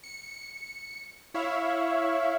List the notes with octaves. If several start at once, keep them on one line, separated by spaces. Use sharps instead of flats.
C#7
E4 C#5 E5 F5